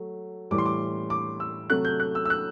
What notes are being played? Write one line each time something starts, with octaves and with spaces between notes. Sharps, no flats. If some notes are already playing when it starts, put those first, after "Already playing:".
Already playing: F#3 A3
A2 E3 G3 D6
C6
D6
D6
E6
C3 F#3 A3 F#6
G6
F#6
E6
E6
F#6